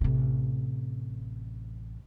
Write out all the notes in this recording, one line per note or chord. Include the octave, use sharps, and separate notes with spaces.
A1 C3